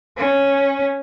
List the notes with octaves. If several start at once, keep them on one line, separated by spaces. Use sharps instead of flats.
C#4